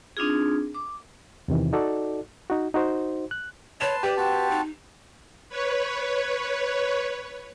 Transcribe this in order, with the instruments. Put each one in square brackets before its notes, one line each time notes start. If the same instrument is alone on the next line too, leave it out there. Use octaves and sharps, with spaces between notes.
[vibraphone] C4 D4 D#4 F4 G#4
D6
[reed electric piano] E2 C3 D#3 E3
D#4 F#4 A4 D5
D#4 F#4
D#4 F#4 C5
F#6
[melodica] B4 A5 C6 [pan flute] C#5 [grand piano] E7
[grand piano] G4 [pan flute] B4 [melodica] D5
[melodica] C4 F#4 A5
[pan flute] D#4
[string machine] B4 C#5